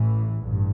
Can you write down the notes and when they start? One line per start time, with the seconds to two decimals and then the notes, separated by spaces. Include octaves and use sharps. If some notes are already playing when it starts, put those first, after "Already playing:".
Already playing: A1 A2 E3
0.42 A1 G2